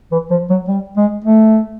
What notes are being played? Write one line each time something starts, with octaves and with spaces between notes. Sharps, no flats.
E3
F3
F#3
G3
G#3
A3